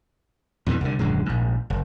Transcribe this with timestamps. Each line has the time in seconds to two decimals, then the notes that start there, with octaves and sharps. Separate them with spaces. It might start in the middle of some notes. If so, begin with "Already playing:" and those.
0.66 F2 B2 D3 E3
0.81 C2 D3
0.99 D#1 F#2 D3 G#3
1.26 A#1 G#2
1.70 F#1